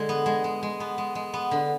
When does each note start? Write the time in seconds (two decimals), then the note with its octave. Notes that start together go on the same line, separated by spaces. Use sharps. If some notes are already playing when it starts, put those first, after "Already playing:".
Already playing: D3 G#3
0.09 B3
0.26 G#3
0.44 G#3
0.63 G#3
0.80 B3
0.98 G#3
1.15 G#3
1.34 B3
1.51 D3